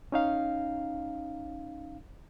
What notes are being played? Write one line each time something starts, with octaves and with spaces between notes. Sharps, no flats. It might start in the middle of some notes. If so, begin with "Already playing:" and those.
C#4 D#4 F5